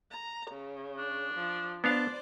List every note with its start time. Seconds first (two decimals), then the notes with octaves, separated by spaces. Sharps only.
0.10 A#5
0.50 C#3
0.98 D4
1.34 F3
1.84 B3 D4 C5 D5 F5 A5